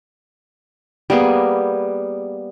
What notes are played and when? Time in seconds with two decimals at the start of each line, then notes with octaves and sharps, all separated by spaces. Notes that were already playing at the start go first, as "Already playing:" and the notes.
1.10 G3 A#3 B3 G#4